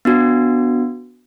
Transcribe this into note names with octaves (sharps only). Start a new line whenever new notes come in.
B3 D4 F#4